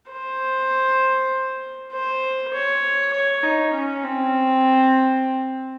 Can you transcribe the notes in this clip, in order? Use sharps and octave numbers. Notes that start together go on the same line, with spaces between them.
C5
C5
C#5
C#5
D#4
C#4
C4